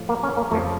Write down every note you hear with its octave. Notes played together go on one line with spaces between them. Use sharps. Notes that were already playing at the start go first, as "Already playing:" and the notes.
Already playing: A2 F3
A#3
C#4
A#3
F2 C#3 F3 A3